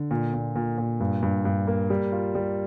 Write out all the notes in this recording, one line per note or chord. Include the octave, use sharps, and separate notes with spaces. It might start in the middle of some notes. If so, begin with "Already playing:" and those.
Already playing: D3
A#2
A#2
A#2
A#2
G2
G2
G2
A#3
G3
F4
G3